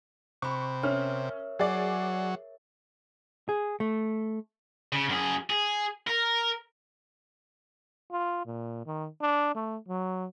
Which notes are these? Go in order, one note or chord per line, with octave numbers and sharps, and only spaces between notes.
C3 B5 C#6 F#6
C#4 A#4 C#5 E5 F6
F#3 G#4 D5
G#4
A3
C#3
F#2 G#4
G#4
A#4
F4
A#2
D#3
D4
A3
F#3